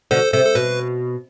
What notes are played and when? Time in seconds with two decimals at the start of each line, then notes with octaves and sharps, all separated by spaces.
0.11 B2 D3 A4 C5
0.33 C3 A4 C5
0.45 A4
0.55 B2 B4